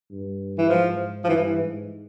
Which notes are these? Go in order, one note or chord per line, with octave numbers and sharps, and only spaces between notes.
G2
E3
G#2 F3
F3
G2 E3
E3
G#2